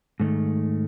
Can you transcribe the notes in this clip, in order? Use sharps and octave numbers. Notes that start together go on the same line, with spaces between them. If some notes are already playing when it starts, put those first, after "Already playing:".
G#2 D#3 A3